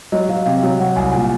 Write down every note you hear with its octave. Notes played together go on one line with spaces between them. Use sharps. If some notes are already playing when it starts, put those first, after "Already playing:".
F#3 D#5
F#3 F5
C3 F5
F#3 F5
F#3 F#5
C2 G#5
A#2 G#5